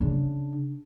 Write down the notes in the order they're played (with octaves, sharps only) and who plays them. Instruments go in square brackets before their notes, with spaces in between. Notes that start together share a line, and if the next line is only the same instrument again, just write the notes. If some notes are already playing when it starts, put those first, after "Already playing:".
[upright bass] C#3 D4